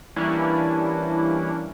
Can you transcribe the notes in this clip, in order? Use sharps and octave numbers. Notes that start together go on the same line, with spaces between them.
E3 G3 A#3 C#4 D4 E4